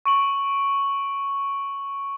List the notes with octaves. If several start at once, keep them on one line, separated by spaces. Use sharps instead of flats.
C#6 D7 F#7